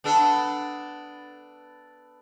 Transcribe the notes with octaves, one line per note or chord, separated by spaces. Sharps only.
B3 D4 A4